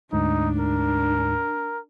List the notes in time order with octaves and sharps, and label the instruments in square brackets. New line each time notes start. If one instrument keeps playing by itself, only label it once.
[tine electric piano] D2 G#2 [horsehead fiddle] D4 [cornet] D#4
[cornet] A#4